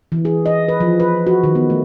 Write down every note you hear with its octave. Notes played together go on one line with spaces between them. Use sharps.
E3
G#4
D#5
B4
F3
B4
F#4
D#3
B3
A3